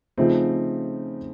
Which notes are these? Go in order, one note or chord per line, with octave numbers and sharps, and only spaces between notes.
C#3 F3 A3 C4 D#4